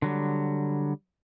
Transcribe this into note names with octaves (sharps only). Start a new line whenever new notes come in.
D3 F#3 G3